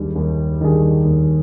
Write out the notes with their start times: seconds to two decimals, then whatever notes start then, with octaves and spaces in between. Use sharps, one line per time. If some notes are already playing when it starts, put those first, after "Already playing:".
Already playing: D#2 D#3 G3 D4 G#4
0.16 D#2
0.61 D#3 G3 D4 G#4
1.05 D#2